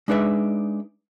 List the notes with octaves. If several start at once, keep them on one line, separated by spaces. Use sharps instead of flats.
G#3 D4 D#4 B4 D5 E5